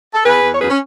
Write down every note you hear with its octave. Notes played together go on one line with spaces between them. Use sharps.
A4
E2 G#4 B4
E2
C#5
F#2 G#4 B4
C#4